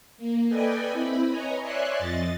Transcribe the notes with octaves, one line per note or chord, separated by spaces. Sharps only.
A#3
A4 B4 D5 D#5 G5 G#5
C4 E4 B5
B4 C#5 D#5 G#5 A#5
C#5 D5 E5 G#5 C6 F#6
F2 D#5 A6